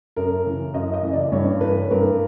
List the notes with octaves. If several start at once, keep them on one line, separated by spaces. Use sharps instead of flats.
F#2 A#4
C#3 E3
F#2 D#5
D#5
C#3 E3
D5
G2 C#5
E3 B4
G2 A#4